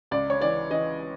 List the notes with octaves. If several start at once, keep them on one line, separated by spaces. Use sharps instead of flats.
C#2 D5
C#5
E3 D5
E3 D#5